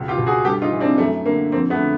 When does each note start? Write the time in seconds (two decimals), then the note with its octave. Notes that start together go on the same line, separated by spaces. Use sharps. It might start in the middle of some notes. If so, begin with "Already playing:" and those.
Already playing: C#2 B2
0.08 F4 G4
0.17 B2
0.27 F#4 G#4
0.44 G2 G4 A4
0.62 D#4 F4
0.72 E3
0.80 C4 D4
0.98 F#2 A3
1.25 D3 A#3
1.52 F2 A#3 C4
1.70 A3 B3
1.79 D3